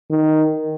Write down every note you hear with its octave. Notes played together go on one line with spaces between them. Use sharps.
D#3